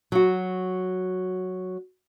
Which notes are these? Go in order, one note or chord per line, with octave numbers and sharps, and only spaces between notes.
F#3 F#4